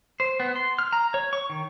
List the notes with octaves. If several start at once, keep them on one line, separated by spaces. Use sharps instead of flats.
C5
B3
C6
F6
A#5
C#5
C#6
D#3